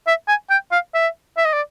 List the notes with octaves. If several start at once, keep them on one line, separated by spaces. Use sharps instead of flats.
E5
G#5
G5
F5
E5
E5
D#5
D5